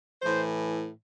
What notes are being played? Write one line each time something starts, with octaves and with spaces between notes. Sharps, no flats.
A2 E3 C5